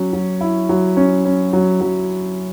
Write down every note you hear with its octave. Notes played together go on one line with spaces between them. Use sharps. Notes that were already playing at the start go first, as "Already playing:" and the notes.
Already playing: F#3 C#4
F#3
E4
F#3
C#4
C#4
F#3
F#3